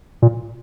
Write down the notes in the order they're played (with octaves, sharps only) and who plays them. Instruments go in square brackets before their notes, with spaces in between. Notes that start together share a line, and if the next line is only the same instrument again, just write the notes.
[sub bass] A#2